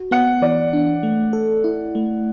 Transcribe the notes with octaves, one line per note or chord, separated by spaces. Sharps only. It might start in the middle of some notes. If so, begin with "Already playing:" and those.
Already playing: F#4
B3 F#5
E3 D5
D4
A3
A4
E4
A3